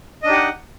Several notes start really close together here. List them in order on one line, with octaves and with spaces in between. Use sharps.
D#5 D4 D#4 G4 F#5